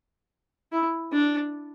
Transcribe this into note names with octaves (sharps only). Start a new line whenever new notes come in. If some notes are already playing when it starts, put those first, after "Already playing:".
E4
D4